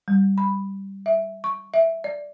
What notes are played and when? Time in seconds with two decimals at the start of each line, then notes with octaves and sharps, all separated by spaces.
0.08 G3
0.38 B5
1.06 E5
1.44 C#6
1.74 E5
2.04 D5